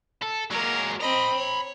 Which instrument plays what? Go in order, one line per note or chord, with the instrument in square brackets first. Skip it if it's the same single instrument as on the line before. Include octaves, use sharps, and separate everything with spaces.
[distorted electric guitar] A4
[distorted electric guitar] F#3 G#3 [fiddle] A#3 A#4
[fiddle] C4 D#5 [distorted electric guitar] A#5 B5
[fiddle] C#5